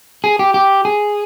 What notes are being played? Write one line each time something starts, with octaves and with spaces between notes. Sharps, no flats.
G#4
G4
G4
G#4